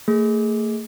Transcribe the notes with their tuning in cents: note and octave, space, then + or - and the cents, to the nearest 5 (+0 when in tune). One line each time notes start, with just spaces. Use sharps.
A3 +40 G#4 +0